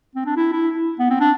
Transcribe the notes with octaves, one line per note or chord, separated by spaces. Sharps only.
C4
D4
E4
E4
B3
C4
D4